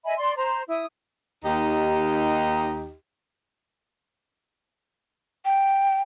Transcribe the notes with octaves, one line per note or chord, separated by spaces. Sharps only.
D#5 E5 G#5 B5
D5 C6
C5 A#5
E4 D#6
D#2 D#4 G4 D#5
G5